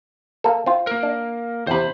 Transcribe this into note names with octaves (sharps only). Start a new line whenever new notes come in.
A#3 A4
C4 F4
A#3 A#4
D4
E2 C3 C5 B5